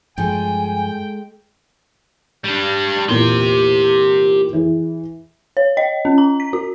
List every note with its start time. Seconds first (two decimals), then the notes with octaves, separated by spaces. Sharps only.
0.18 G2 F3 G#3 A4 G5 G#5
2.44 G3 D4
3.09 E2 A#2 E4 G4 C6
4.53 E3 G#4
5.57 C#5
5.77 D#5
6.05 C#4
6.18 A#5
6.40 B6
6.53 F#4